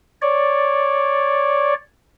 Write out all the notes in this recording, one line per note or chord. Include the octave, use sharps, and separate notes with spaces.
C#5 D5